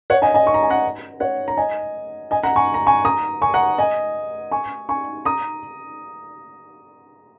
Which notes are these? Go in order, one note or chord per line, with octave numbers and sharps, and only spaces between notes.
C#5 F#5
D#5 G#5
D#5 G#5
C#6
A#5
G#5
F#5 A#5
C#5 F#5
A#5
D#5 G#5
D#5 G#5
F#5 A#5
G#5 C#6
A#5
G#5 C#6
A#5 D#6
G#5 C#6
F#5 A#5
D#5 G#5
G#5 C#6
G#5 C#6
A#5 D#6